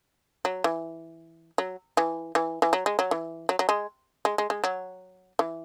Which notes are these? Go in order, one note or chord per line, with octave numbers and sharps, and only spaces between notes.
F#3
E3
F#3
E3
E3
E3
F#3
G#3
F#3
E3
F#3
F#3
G#3
G#3
G#3
G#3
F#3
E3